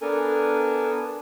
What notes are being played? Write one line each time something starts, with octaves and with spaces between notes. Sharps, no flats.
B3 D4 A4 A#4 G#5